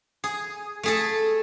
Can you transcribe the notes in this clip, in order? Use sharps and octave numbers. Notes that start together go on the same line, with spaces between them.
G#4
A3 G#4 A4